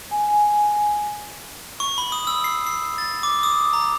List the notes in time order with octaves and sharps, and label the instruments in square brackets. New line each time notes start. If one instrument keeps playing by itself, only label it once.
[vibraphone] G#5
[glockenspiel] C#6
B5
D#6
E6
C7
C7
A6
D6
D#6
A#5